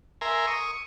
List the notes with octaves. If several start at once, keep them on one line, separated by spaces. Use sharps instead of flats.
A#4 E5 G#5 A#5 C6
C#6 D#6